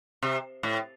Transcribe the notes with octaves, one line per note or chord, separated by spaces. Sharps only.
C3
A2